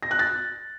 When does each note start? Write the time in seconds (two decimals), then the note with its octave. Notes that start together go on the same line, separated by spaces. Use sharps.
0.03 A#6
0.11 F#6
0.19 A6